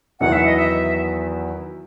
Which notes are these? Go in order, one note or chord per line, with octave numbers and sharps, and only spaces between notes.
E2 D#3 F#3 B3 E4 F#5
E5
D#5
E5